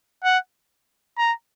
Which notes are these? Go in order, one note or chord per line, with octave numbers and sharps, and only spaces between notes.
F#5
A#5